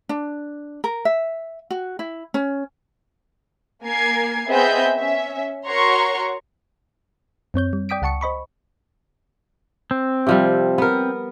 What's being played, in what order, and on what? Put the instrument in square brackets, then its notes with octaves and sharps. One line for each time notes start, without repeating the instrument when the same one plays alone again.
[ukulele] D4
A#4
E5
F#4
E4
C#4
[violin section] A#3 A#4 G#5 G#6 C7
B3 C4 G#4 D#5 E5 G6
C#4 E5
F#4 A#4 C#5 A#5 C6 C#6
[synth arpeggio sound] F#2 C4 C#5 G6
G3
D5 G5 D#6 B6 D7
C#2 F#5 A5 C#6 C#7
C5 D#5 B5 C#6
[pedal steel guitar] C4
[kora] C3 F3 G3
B3 A#4